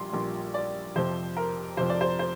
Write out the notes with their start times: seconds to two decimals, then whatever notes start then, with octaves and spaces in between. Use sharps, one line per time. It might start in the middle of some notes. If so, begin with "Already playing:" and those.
Already playing: A#1 A#2 G3 C6
0.12 A#1 A#2 G3
0.54 D5
0.95 F2 C3 F3 C5
1.37 A#4
1.77 F2 C3 F3 C5
1.90 D5
2.01 C5
2.19 C5